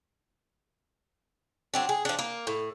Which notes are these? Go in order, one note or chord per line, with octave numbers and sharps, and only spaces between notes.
F#3 C4 D4
G#4
F3 D4
A#3
A2